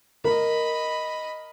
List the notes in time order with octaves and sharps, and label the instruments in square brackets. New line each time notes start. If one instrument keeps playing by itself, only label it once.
[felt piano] A#4 [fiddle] D#5 B5